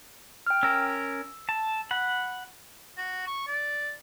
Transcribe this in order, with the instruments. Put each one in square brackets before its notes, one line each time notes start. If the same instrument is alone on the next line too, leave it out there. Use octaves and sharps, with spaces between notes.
[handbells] G5 F6
[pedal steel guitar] C#4 A#4 [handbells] E6
[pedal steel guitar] A5
F#5 B5
[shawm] F#4
C#6
D5